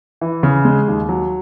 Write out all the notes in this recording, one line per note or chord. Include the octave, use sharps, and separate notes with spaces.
E3
C#3
G#3
D#2
F#3